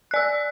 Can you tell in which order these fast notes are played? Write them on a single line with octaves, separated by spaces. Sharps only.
F#6 D5 E6